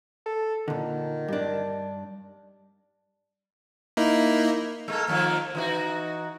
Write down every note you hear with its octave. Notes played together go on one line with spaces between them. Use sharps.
A4
A#2 D3 D#3
G2 D4
A#3 D#4 E4
G#3 A#3 A4
D#3 F3 A#3
E3 D#4 F#4